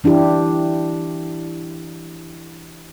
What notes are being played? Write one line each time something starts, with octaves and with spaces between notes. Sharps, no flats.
E3 D4 E4 G4